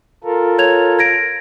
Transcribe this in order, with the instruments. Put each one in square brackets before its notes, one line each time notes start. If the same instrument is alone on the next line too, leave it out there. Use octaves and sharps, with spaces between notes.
[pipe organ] F4 A4 A#4
[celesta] C#5 G#6 F7
G#6 A#6 D7